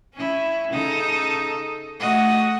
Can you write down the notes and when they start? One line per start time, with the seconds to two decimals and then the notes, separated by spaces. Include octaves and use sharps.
0.14 C#4 E4
0.70 C#3 D#4 A4
2.00 A3 F#4 D#5